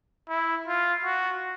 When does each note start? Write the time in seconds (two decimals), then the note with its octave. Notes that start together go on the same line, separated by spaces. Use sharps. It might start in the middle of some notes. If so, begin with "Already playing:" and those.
0.29 E4
0.67 F4
1.05 F#4